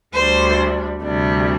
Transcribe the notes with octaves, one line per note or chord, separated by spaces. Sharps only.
D2 D3 G3 D4 C5
D2 C3 G3 D4